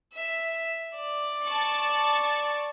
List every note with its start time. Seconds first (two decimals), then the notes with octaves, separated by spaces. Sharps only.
0.13 E5
0.96 D5
1.46 A5 C#6